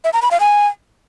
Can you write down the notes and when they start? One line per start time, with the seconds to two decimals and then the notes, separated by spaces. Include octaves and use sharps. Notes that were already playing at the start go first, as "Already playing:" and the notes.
0.04 E5
0.13 A#5
0.22 B5
0.31 F5
0.40 G#5